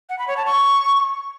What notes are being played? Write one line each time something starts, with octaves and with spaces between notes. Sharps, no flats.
F#5
B5
C#5
A5
C#6